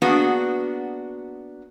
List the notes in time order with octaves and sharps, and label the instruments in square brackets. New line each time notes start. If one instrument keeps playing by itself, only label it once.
[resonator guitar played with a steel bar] A#3 B3 D4 F#4 G#4